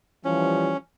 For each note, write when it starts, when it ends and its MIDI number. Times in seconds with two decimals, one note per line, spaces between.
0.25 0.73 52
0.25 0.73 53
0.25 0.73 55
0.25 0.77 61